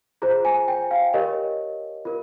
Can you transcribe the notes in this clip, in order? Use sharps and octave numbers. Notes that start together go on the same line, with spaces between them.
F4 G#4 C5 A#5
G#5
G5
F5
G4 A#4 C#5 D#5
F4 A#4